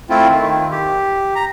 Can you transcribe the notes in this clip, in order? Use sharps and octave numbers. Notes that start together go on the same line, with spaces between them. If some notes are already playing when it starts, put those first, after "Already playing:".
A3 C4 E4 F4
D#3
G4
A#5